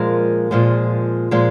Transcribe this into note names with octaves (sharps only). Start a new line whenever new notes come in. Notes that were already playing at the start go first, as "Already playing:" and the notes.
Already playing: A#2 F3 G#3 A#4
A#2 F3 G#3
A#2 F3 G#3